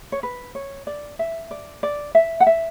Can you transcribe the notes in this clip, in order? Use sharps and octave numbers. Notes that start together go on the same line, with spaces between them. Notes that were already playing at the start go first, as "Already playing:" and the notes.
C#5
B4
C#5
D5
E5
D5
D5
E5
F#5
E5